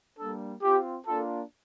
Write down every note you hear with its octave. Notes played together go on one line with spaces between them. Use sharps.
G3 A#3 D4 A4
C4 F4 G4
A#3 D4 F4 A4